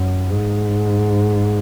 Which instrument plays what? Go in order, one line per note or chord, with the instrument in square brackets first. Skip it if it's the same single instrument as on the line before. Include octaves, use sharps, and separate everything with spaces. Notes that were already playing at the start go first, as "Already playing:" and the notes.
Already playing: [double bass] F#2
G#2